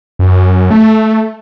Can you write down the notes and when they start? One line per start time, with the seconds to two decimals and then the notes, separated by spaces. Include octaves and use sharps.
0.19 F#2
0.71 A3